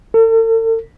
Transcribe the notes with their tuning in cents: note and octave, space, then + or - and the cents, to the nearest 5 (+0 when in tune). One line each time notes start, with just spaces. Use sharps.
A4 +45